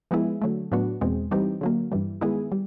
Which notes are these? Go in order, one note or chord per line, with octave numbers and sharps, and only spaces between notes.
F3 G#3 B3 E4 G#4
D3 F#3 A3
A2 F#3 B3 D4 F#4
E2 B2 G#3 C4
E3 G3 C4 D#4 G4
D3 F#3 A#3
G2 E3 G3
D#3 G#3 B3 E4 G#4
G3